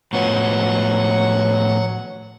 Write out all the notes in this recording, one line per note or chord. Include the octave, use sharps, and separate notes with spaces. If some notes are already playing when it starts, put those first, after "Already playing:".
A2 F3 F#3 B3 F#5 C#6